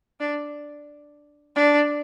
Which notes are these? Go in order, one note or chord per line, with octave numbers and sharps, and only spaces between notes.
D4
D4